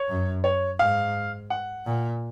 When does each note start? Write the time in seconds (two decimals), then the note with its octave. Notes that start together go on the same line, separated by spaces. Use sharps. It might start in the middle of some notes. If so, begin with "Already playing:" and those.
Already playing: C#5
0.09 F#2
0.44 C#5
0.79 G#2 F5
1.50 F#5
1.86 A#2